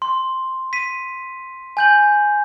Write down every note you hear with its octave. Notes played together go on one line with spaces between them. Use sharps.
C6
B6 D#7
G#5 G6 F#7